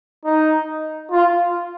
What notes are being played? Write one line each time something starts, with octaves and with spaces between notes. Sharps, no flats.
D#4
F4